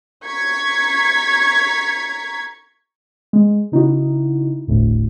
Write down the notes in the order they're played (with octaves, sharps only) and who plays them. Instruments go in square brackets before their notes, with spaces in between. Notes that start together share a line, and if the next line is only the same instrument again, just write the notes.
[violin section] A#5 C#6 G#6 B6
[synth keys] G#3
C#3 D#4 E4 F#4
G1 D2 A2